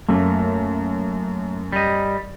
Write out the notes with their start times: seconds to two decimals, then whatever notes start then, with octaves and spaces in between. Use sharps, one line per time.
0.09 F#2 A3 A#3
1.72 G3 D#5